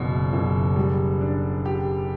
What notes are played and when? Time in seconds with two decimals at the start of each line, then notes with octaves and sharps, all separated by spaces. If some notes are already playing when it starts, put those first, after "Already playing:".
Already playing: F#1 E2 B2
0.33 F#1
0.76 G3
1.21 D4
1.66 G4